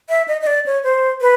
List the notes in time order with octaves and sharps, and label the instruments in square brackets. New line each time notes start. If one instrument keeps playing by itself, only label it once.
[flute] E5
D#5
D#5
D5
C#5
C5
B4